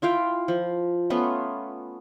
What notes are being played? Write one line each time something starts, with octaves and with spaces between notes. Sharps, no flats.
E4 F4 F5 G5
F3
A3 B3 C#4 F4